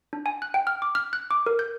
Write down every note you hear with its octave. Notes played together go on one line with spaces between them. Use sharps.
D4
G#5
F#6
G5
F6
D6
F6
F#6
D6
A#4
G6